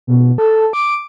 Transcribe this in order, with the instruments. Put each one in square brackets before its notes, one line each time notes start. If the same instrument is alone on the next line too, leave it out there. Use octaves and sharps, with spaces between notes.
[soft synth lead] B2
A4
D6